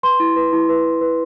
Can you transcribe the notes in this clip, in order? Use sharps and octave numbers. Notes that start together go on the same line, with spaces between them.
B4 C6
E4
B4
E4
B4
B4
B4